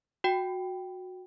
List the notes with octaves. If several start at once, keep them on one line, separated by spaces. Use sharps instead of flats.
F#4 G5